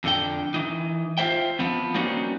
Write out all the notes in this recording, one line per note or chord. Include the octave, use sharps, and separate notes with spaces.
F2 D3 G5
E3 D#4
F4 G4 C5 E5 G5
F3 B3 C4
G3 A#3 C4 C#4 D#4 F#4